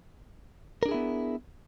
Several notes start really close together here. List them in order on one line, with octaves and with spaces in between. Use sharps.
A#4 D4 G#4 E4 B3